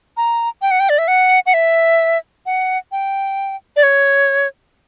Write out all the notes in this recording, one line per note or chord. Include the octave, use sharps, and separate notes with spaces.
A#5
G5
F#5
G5
D5
E5
F#5
F#5
E5
F#5
G5
D5
C#5